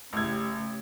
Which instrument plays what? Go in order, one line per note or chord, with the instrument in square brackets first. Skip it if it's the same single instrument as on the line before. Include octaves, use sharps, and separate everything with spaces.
[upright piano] A1 G#6 [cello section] C#3 A3 G4